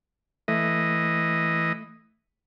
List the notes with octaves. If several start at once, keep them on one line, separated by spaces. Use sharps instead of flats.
E3 A3 D#5